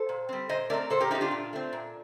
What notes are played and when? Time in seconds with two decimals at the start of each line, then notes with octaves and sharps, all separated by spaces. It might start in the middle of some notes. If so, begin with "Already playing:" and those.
Already playing: A4 C5
0.09 A#2
0.29 G3 C4
0.49 A#2 C5 D#5
0.70 A3 C4 A#4 D5
0.90 A#2 A4 C5
1.00 G4 A#4
1.11 A3 C4 D#4 G4
1.21 D4 F4
1.31 A#2
1.53 A3 C4
1.73 A#2